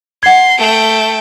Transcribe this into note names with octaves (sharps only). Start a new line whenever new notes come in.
F#5 C6 G#6
A3 G5